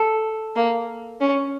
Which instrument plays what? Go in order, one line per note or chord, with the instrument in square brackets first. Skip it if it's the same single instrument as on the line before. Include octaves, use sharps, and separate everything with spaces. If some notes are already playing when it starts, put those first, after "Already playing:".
Already playing: [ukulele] A4
[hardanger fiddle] A#3
C#4